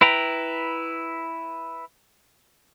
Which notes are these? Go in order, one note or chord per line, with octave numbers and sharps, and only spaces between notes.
E4 B4 G5 A#5